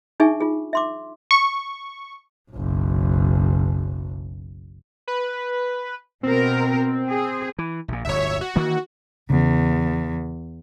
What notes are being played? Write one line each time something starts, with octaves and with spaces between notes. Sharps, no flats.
D4 D#4 G#4 E5 G#5 C#6
F4 G#4
E5 C6 D6
C#6
F#1 B1
B4
B2 C4 A#4
G#4
E3
A#1 A#2
D1 G1 C#5 E5
F#4
D#3 E3 A#3
E2 C#3